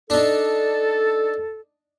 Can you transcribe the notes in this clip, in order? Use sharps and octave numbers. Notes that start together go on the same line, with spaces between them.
D4 D#4 A4